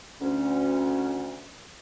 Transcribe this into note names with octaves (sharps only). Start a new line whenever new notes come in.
D2 C#4